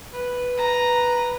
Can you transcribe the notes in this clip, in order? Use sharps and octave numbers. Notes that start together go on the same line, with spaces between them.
B4
A#5